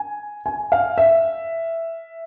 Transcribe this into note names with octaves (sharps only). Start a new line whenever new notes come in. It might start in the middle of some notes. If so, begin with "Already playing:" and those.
Already playing: G#5
G#5
F5
E5